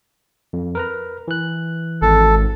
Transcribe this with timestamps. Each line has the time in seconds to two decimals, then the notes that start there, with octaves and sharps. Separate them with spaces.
0.53 F2
0.75 A#4 B4 A#5
1.28 E3 F#6
2.02 G#1 A4